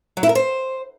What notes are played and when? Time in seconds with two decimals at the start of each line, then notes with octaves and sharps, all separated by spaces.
0.17 F#3
0.23 E4
0.29 A#4
0.35 C5